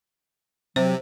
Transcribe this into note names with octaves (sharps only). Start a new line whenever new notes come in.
C3 F#3 C5